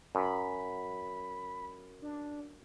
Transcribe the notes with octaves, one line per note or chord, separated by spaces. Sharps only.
F#2 B5
D4